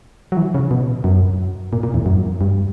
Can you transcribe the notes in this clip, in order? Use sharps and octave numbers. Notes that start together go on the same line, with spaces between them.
F#3
E3
C#3
B2
F#2
A#2
A#2
E2
F#2
G2